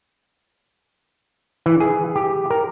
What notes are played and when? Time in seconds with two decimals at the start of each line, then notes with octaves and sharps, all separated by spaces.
1.66 E3
1.80 G#4
2.15 G4
2.50 A#4